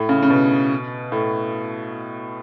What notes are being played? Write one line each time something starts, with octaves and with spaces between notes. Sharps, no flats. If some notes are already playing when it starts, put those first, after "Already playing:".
Already playing: A2
C#3
C#3
B2
A2